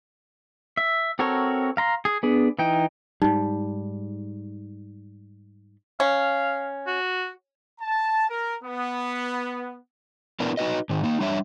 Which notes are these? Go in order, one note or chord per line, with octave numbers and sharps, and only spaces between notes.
E5
C4 F#4 A4 A#4 C#5
F5 A#5 C6
G#4
B3 D4 G#4
E3 D#4 G5
G#2 G3 D#4
C#4 F5
F#4
A5
A#4
B3
B3 D4 E4 A#4 B4
D#4 F#4 B4 D#5
G#2 D#3
A#3 D#4
G3 D4 C#5 E5